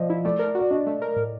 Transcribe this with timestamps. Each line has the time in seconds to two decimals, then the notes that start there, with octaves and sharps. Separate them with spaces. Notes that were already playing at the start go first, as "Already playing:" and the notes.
Already playing: F3 D5 D#5
0.10 E4
0.25 A3 D5
0.39 A#4
0.55 F#4 D5
0.71 D4 D#5
0.86 A3
1.02 A#4
1.16 A2